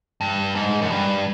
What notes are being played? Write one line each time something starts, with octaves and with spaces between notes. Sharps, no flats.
G2
G#2
F#2
G2